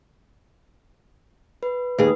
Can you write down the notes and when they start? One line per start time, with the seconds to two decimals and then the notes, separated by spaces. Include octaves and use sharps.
1.63 B4
1.98 D#2 G#4 B4